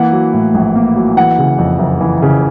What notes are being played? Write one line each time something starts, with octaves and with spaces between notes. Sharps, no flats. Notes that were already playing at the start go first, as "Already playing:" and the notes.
Already playing: E3 A#3 F#5
F#3
A2
A#1
A#3
F#3
E3 F#5
C#3
F2
F#1
E3
C#3